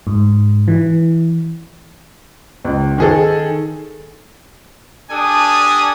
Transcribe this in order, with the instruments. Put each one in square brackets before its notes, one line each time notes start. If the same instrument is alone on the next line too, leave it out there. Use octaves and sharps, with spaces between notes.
[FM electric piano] G#2
E3
[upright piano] C#2
D#3 G#4 A4
[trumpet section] D4 G4 A4 G#5 D#6